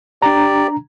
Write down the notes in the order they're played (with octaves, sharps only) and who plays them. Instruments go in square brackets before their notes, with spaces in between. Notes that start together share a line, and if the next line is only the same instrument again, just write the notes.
[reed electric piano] D4 A#5 [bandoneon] G4 D5